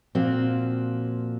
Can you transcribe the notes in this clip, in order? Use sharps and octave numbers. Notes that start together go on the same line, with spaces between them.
A#2 F3 C4 F#4